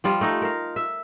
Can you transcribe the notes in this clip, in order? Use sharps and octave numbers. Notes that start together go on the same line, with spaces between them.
F3 G3 F4
A3 D#4
A#4 F5
E5